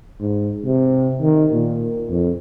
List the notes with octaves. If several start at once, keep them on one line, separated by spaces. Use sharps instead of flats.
G#2
C3
D#3
A#2
F2